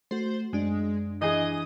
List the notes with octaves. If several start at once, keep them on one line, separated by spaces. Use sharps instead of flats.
A3 F#4 C5
F#2 G#3 D4
E3 G#4 D#5 D#6